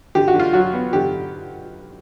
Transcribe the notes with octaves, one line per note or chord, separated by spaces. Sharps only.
D3 G4
F#4
D3
F4
F#3 F#4
B3
D3 G4